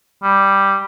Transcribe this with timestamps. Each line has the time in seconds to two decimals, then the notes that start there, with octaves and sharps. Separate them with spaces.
0.23 G3